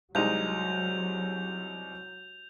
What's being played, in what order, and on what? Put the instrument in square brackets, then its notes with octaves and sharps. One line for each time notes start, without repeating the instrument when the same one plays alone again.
[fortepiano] C2 G#3 D#4 [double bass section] F#3 [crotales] G6 F7